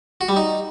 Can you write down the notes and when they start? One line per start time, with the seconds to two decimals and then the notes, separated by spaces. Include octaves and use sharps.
0.21 F#4
0.29 G3
0.36 D#4